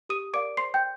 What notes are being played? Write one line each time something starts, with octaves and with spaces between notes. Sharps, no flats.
G4 D#6 D#7
A#4 D5 F5 D6 D7
C5 C6 C7
G5 G6